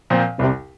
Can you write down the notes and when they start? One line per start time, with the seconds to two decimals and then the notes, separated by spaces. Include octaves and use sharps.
0.10 A#2 F3 C4
0.39 C2 C3